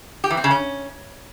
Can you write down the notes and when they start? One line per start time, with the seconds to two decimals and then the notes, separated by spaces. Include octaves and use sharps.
0.24 G4
0.30 E3
0.37 C4
0.44 C#3
0.51 C#4